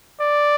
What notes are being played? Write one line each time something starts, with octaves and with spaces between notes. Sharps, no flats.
D5